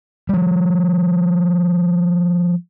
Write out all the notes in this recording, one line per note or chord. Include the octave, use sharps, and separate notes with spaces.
F3 G3